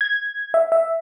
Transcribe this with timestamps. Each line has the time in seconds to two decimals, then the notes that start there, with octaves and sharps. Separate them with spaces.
0.01 G#6
0.54 E5
0.72 E5